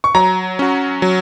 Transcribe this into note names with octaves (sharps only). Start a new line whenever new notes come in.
C#6
F#3 A#5
C#4 F#4
F#3